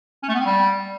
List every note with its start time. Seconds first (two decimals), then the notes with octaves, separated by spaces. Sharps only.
0.23 C#4
0.29 A3
0.35 B3
0.40 C4
0.46 G3